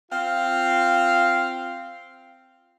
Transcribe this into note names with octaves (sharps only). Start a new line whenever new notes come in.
C4 F4 F5